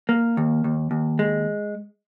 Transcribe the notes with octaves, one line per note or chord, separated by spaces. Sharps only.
A#3
D#2
D#2
D#2
G#3